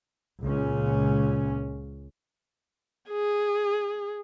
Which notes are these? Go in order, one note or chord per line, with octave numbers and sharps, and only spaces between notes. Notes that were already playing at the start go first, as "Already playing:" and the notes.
C#2 A#2 C#4
G#4